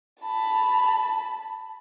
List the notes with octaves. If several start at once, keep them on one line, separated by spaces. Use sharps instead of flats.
A5 B5